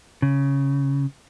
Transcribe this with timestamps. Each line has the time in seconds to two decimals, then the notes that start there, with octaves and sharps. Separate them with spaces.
0.22 C#3